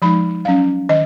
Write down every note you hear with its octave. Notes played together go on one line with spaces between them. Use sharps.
F3 G#3 D#4 B5
F#3 C#4 F5
D#3 D#5